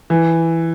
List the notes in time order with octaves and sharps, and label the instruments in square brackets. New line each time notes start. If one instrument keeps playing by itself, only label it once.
[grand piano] E3